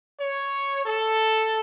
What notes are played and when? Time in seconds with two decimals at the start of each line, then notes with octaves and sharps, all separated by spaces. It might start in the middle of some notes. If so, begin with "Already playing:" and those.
0.19 C#5
0.85 A4